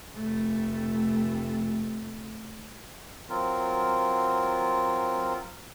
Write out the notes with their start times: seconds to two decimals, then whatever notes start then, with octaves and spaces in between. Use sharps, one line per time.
0.15 F1 A3
3.29 F#3 C4 F4 A#4